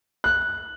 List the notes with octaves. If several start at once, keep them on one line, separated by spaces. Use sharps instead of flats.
F#6